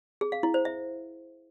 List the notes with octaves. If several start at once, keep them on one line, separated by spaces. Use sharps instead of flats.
G#4
F5
E4
C5
E5